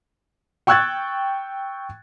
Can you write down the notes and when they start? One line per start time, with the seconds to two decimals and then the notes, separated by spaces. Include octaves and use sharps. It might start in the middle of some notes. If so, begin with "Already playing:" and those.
0.67 G5 C#6 E6 F#6 G#6 A6